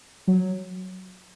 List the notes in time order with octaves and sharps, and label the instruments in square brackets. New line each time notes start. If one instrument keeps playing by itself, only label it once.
[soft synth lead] F#3